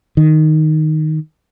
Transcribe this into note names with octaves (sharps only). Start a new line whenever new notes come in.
D#3